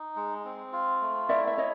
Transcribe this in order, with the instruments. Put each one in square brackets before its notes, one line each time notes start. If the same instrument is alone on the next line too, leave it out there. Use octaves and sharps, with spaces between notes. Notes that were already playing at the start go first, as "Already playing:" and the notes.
Already playing: [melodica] D#4
G#3
C4
F4
A3
[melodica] E4 [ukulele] D5 E5
[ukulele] E5
[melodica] A4 [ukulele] C#5 D#5